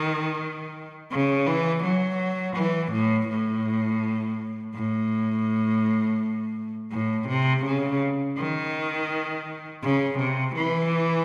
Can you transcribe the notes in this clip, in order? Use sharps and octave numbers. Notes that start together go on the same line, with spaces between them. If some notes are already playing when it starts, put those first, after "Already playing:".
Already playing: D#3
C#3
E3
F#3
E3
A2
A2
A2
A2
C3
C#3
D#3
C#3
C3
E3